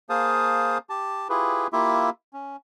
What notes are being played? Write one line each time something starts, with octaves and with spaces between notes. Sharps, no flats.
A#3 G#4 C5 F5 A5 D#6
G4 A5
E4 F4 G4 G#4 B4
A#3 E4 F4 G4 E5
C#4